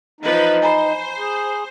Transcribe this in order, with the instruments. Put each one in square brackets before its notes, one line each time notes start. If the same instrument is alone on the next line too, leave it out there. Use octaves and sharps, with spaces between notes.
[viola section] E3 F3 B4 [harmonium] D#4
[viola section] C5 [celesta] G#5 A#5 B5
[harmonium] G#4